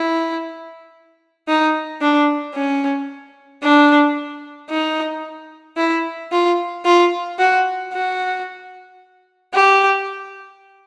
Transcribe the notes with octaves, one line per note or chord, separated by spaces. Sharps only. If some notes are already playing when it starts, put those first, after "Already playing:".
Already playing: E4
D#4
D4
C#4
D4
D#4
E4
F4
F4
F#4
F#4
G4